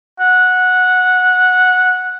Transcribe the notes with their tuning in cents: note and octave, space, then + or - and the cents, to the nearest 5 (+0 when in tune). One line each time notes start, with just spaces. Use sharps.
F#5 -10